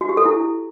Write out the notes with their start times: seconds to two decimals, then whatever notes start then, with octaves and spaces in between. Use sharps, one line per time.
0.01 F#4
0.09 G4
0.17 A4
0.25 E4